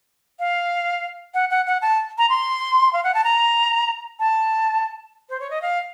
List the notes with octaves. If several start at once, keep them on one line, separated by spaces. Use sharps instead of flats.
F5
F#5
F#5
F#5
A5
A#5
C6
F5
F#5
A5
A#5
A5
C5
C#5
D#5
F5